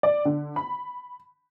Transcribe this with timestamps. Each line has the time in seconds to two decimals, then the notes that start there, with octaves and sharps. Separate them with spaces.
0.03 D5
0.25 D3
0.56 B5